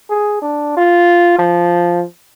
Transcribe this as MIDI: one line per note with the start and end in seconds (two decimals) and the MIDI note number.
0.10 0.38 68
0.42 0.75 62
0.77 1.37 65
1.39 2.04 53